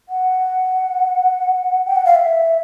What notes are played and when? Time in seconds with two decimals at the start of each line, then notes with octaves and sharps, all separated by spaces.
0.09 F#5
1.86 G5
1.95 F#5
2.05 F5
2.15 E5